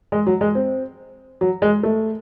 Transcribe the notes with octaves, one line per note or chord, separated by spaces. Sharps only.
G#3
F#3
G#3
C4
F#3
G#3
A3